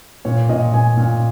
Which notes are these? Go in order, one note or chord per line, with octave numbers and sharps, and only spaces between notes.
A#2 C#5
A#2 D#5
A#2 G#5
A#2